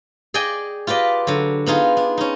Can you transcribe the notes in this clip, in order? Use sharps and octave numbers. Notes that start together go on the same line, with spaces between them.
G#4 D5 D#5 G5 G#5
F4 G4 B4 D5 D#5
D3 F#3
B3 D#4 F4 G#4
D4
C#4 D#4